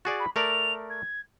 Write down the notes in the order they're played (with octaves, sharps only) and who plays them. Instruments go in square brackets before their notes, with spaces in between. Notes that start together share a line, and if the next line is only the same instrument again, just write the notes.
[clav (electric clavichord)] F#4 G#4 D5 [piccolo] A6
[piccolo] B5
[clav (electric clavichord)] A3 A#4 D5 [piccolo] F7
[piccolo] G#6